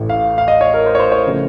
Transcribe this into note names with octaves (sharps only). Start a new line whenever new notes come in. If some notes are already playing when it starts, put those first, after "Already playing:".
Already playing: A1 A2 A3
F5
F5
D#5
C#5
A#4
C5
C#5
C5
C#5
C#3 F3 A3